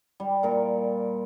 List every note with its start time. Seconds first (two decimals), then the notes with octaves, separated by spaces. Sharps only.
0.20 G3
0.43 A#2 A#4